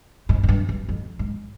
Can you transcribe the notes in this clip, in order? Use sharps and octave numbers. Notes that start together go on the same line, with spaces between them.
G#2
G#2
G2
G2
F2
G#2